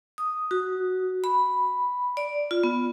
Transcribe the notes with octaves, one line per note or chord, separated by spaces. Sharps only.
D#6
F#4
B5
D5
F4
B3